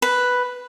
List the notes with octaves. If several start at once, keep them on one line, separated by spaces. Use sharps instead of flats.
B4